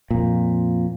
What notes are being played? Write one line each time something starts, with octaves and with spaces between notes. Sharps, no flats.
F2 A#2